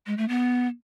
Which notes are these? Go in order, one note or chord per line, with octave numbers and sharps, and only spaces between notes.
G#3
A3
B3